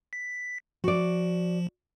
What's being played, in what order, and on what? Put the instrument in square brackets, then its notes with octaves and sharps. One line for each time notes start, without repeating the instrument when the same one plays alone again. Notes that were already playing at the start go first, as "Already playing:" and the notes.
[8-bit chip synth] B6
[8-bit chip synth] F3 [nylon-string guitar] F#4 D5